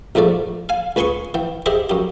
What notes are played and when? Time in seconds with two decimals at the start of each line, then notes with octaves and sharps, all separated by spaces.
0.15 A#1 F2 G#2 A3 D5
0.69 F5 G#5
0.96 C#2 B4 G#5 C6 C#6 D#6
1.34 E3 G5
1.66 G4 G#4 C5 D#5 E5
1.90 F#2 G4